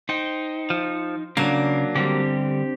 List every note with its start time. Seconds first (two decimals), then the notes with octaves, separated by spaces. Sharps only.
0.09 D#4 C5 G5
0.70 F3
1.37 C#3 F#3 A#3 D4
1.95 D3 G3 C4 G4